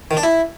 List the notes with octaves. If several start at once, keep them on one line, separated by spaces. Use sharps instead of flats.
D#3
D4
E4